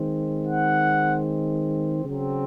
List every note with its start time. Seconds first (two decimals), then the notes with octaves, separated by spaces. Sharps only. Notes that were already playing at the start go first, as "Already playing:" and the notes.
Already playing: D#3 G#3 C4
0.45 F#5
2.04 C#3 F#3 C4